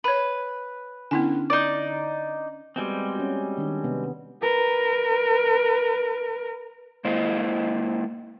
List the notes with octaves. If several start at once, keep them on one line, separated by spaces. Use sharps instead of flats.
B4 C#5 B5
D3 B3 C#4 D4 E4 G#5
D#4 D5
G3 G#3 B3 C4 F#4 G4
C#4 F#4
D#3 D4
C3 B3
A#4 B4
G#3 A#3 E4 C5 D#5 F5